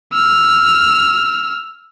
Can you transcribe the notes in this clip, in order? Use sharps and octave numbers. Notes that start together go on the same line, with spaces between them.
E6 F6